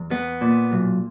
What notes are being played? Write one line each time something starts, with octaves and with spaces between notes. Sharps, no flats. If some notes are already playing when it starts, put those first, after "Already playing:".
Already playing: E2
B3
A#2
B1